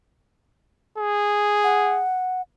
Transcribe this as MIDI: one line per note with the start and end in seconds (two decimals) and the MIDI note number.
0.98 2.05 68
1.64 2.41 78